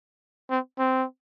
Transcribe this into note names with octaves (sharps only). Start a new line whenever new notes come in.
C4
C4